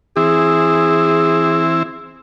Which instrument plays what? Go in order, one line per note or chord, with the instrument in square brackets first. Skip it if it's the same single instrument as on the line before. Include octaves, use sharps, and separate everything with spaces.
[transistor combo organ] E3 C4 E4 [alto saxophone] G#4